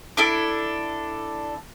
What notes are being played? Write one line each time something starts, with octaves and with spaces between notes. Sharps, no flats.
D4 E4 A4